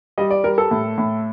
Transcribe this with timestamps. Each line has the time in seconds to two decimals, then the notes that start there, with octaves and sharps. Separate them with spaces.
0.18 G3 D#5
0.30 D5
0.44 G3 A#4
0.58 A4
0.71 A2
0.98 A2